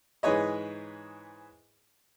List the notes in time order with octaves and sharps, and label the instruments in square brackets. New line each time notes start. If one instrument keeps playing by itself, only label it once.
[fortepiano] G#2 E3 G#4 B4 C#5 D#5